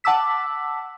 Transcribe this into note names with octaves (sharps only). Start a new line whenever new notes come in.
F#5 A5 D6 E6 B6